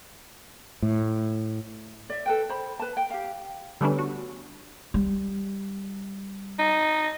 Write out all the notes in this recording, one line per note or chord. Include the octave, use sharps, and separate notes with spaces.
A2
D5 E5
A4 B4 G5
C5 B5
B4 A5
G5
G4 F5
D3 G3 A3 B3 C#4 D4
F#4
G3
D#4